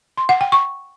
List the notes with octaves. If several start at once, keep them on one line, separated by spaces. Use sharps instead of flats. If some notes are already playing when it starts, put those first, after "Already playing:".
C6
F#5
G5
C#6